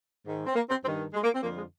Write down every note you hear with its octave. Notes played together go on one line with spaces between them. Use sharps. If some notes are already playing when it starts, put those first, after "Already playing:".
G#2 D#3
C4
A#3
C4
G2 D#3 C4
G#3
A#3
C4
F2 D3 F3 A#3
G#3